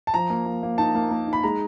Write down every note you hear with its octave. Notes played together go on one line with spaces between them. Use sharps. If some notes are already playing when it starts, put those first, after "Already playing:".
A5
F3 A#5
A#3
A#3
A#3
D#4 A5
A#3
A#3
D#4
B5
G#3 A#5